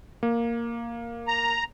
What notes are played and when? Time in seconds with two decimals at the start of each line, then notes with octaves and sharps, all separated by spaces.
0.23 A#3
1.28 A#5